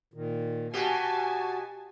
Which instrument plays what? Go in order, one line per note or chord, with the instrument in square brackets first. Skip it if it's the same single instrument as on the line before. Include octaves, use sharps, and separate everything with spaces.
[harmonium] A#2 D#3
[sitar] B2 G4 [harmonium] F#4 [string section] G#5 A5